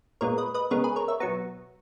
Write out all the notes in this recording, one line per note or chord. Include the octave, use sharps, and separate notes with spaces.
A#2 G#3 B3 A#4 C#5
B4 D#5
B4 D#5
C#3 G#3 B3 A#4 C#5
G#4 B4
A#4 C#5
C#5 E5
B2 F#3 B3 A#5 C#6